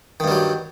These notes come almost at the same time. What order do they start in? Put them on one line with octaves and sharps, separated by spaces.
D#3 G2 G3 F#3